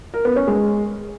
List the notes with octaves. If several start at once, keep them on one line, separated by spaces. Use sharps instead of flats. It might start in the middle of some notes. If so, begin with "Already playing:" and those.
A#4
B3
C#4
G#3